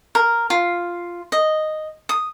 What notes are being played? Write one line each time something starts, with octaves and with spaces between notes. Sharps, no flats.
A#4
F4
D#5
D#6